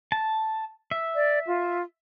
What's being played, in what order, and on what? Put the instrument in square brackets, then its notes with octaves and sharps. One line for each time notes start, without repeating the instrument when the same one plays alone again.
[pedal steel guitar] A5
E5
[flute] D5
F4